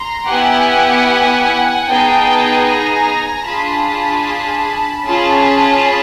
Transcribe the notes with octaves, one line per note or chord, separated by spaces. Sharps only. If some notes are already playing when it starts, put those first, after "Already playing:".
Already playing: A#5 C6
B3 E4 G4 F#5 G#5
B3 D#4 G#4 G5 A5
G#5 A#5
D4 F4 G#4 A5 B5
C#4 F4 G#4 A5 B5